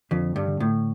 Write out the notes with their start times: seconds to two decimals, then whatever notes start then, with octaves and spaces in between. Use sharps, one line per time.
0.11 F2 D3
0.36 G2
0.48 D3
0.60 A2